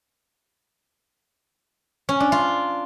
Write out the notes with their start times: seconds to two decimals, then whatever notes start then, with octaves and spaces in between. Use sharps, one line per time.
2.09 C#4
2.20 D4
2.32 F4